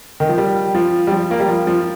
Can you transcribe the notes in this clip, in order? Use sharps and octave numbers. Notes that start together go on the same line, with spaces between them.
D#3
F3
G3
F3
G3
F3
A#3
G3
F3
F3